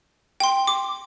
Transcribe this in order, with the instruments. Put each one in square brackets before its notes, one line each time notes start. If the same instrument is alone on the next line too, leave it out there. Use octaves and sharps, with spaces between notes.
[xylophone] G5 C6
D6